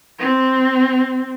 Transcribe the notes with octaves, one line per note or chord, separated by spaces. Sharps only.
C4